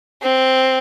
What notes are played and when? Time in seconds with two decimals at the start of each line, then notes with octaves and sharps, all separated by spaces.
0.22 C4